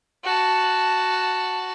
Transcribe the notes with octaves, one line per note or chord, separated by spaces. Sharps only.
F#4 A5